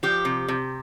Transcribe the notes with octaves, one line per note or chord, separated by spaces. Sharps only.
F3 G4
C3
C3